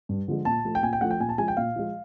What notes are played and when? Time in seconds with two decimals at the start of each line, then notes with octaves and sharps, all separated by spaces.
0.09 G2
0.28 D3 F3 G#3
0.45 A#2 A5
0.65 F3 A3
0.75 G5
0.83 A#2 G#5
0.93 G5
1.01 F3 A3 F#5
1.11 G5
1.20 A#2 G#5
1.29 A5
1.38 F3 G#3 G#5
1.48 G5
1.57 A#2 F5
1.76 F3 G#3